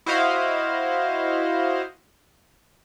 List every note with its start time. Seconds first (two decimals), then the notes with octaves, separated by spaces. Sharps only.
0.06 E4 F#4 C5 D#5 F5